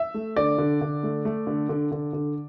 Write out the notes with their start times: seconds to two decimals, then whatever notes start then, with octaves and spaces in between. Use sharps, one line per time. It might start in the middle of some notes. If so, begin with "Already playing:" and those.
Already playing: E5
0.14 A3
0.36 D3 D5
0.58 D3
0.81 D3
1.03 A3
1.25 A3
1.47 D3
1.69 D3
1.91 D3
2.13 D3